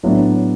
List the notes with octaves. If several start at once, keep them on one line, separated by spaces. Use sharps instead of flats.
A2 F#3 B3 D4